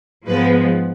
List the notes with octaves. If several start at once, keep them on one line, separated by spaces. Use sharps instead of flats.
G#2 F3 G#3 B3 B4